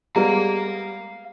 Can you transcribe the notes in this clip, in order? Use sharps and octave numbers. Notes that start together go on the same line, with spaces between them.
G3 G#3 B3 F5 A#5